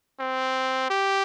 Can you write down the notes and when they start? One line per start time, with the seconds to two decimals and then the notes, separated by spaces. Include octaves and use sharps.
0.20 C4
0.90 G4